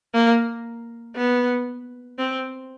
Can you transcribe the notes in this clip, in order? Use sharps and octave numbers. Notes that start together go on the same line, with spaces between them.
A#3
B3
C4